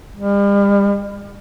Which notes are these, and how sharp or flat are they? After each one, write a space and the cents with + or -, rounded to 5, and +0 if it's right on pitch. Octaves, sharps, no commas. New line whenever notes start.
G3 +40